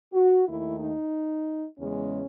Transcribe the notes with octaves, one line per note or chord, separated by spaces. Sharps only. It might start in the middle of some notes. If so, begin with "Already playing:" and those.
F#4
D#2 D#3 A3 E4
D#4
E2 C#3 G#3 C#4